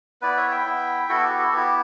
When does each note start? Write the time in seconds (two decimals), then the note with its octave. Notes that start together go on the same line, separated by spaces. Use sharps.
0.22 B3 E4 B4 D5
0.37 C#5 E5
0.51 E5 G5
0.65 B3 E4
1.09 B3 E4 F#4 A4
1.23 G4
1.38 F#4 A4
1.53 B3 E4 G4